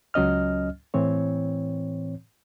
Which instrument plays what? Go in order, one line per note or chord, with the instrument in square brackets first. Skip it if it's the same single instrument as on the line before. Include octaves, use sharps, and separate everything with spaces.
[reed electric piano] C#2 F#3 C#4 D#5 F6
A2 E3 C4 C#5